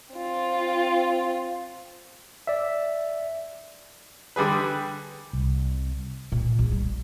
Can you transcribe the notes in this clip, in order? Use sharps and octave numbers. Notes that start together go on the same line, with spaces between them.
C4 F4
D5 E5
D3 G3 G#4 B4
C2
A#2
A#1
G3